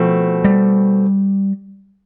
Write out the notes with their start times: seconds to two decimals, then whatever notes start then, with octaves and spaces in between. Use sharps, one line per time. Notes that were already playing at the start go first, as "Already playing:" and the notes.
Already playing: B2 F3 A3 C4
0.44 G3